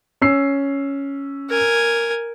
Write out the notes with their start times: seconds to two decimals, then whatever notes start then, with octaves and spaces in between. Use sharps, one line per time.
0.22 C#4 E6 C7
1.50 A#4 G#5